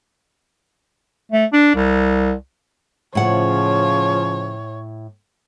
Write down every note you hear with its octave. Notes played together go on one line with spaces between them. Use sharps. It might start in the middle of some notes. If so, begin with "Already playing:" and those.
A3
D4
C2
A2 C#3 F3 C#5 F#5